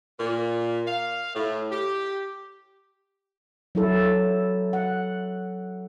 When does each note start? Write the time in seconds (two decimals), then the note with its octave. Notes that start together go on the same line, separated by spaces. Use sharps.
0.19 A#2
0.87 F5
1.34 A2
1.71 G4
3.75 F#3 E4 A4
4.73 F#5